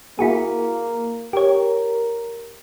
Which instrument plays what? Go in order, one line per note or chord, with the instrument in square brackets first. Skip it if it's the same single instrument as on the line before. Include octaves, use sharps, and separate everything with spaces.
[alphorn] A#3 [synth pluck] E4 F#4 G#4
[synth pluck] G4 C#5 [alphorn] A#4